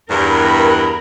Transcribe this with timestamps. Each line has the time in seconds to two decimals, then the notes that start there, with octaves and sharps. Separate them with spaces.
0.10 E2 G2 A#4 B5